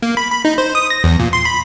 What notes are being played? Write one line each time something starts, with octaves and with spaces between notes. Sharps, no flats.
A#3
B5
B5
D#4
C5
D#6
A#6
E2
A#2
C6
B5